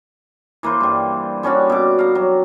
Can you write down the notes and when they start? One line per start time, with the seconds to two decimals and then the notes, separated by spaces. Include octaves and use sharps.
0.63 E3 A#3 B4 C5
0.81 G2 G3
1.43 G3 C#4 D4 F#4
1.70 B2 D6
1.99 F5 A#5
2.15 F#3